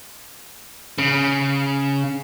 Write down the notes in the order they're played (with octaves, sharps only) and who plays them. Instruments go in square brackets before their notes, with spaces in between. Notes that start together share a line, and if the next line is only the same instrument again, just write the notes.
[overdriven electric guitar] C#3